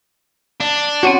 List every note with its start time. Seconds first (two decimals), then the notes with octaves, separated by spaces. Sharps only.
0.60 D4
1.03 C4 C#4 F#4 C#5